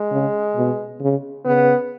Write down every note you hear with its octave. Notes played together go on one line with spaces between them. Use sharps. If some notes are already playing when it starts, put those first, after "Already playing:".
Already playing: G#3
C#3
B2
C#3
C#3 B3